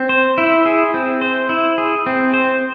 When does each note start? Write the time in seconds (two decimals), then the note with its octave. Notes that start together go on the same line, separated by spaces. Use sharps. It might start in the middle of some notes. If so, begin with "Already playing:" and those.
Already playing: C4
0.09 C5
0.38 E4
0.66 G#4
0.94 C4
1.21 C5
1.49 E4
1.78 G#4
2.06 C4
2.34 C5